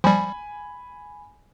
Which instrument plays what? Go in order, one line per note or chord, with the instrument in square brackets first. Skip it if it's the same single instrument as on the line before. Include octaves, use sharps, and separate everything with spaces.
[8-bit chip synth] F3 G3 [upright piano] G#5 B5